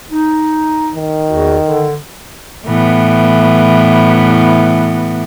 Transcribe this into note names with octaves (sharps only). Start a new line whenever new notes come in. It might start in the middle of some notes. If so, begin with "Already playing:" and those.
D#4
D#3
E2 F#4
D3
A2 E3 B3